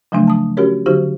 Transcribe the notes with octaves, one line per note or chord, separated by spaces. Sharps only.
C#3 F3 F#3 A3 D4
A5 D#6
C#4 F#4 G4 A#4 C#5
D3 F#3 D#4 F#4 G4 C5